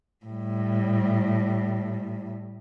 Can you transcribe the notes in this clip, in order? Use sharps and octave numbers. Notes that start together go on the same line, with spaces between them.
A2 G3